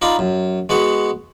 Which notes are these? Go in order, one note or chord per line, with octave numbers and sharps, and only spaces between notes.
D#4 F4 D5 A#5 B5
F#2
G#3 B3 F#4 F#5